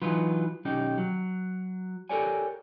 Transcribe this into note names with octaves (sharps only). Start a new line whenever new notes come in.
E3 F#3 D#4 F4 B4 C6
B1 D#3 C#4 D#4 G4
F#3
G4 A4 A#4 C#5 D5 G#5